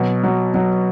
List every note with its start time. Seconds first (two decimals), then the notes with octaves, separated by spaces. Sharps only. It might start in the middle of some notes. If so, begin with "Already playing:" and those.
Already playing: B2 F#3
0.23 F#3
0.54 F#3